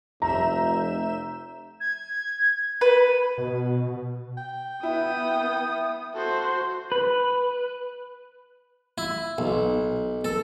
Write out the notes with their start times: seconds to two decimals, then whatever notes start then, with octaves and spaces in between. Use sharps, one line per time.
0.22 F1 E5 A#5 G6 E7
1.80 G#6
2.81 B4 D#7
3.38 B2
4.38 G5
4.83 B3 E4 D#6
6.15 F#4 A4 C5
6.92 B4
8.98 E4
9.38 B1
10.25 A4